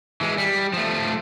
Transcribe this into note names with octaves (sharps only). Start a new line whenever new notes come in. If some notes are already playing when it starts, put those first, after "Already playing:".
E3 G#3
G3
F3 A3